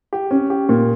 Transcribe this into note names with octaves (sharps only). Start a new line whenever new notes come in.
G4
C#4
G4
A#2